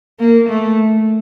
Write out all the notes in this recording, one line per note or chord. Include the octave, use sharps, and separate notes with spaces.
A#3
A3